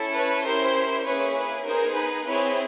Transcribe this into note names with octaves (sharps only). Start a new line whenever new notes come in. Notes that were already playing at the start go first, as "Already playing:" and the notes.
Already playing: C#4 E4 A4
B4 C#5
C#4 E4 G4 A#4 C5
A#3 C#4 E4 G#4 B4 C#5
B4
B3 D#4 G#4 A#4 C5
B4
C4 E4 G#4 B4 C#5